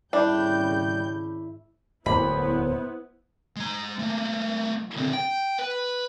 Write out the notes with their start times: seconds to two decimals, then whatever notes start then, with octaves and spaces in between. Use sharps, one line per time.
0.13 G#1 C#3 G3 D4 E4 G5 G6
2.06 D1 E2 A#3 B3 E4 C5 B5
3.56 G#3 A#5
3.99 A3 A#3
4.96 D3 C4
5.13 G5
5.59 B4